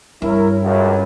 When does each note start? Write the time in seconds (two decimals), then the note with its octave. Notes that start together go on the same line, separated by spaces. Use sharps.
0.22 G2 C#4 E4 A#4
0.62 C#2 F#2